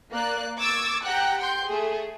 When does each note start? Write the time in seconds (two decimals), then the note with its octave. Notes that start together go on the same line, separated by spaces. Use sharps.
0.12 A#3 D5 F#6
0.59 C#6 D6 E6 G#6 A6
1.04 G4 F#5 G5 A#5 F#6
1.39 G5 C6 G6
1.67 A3 G#4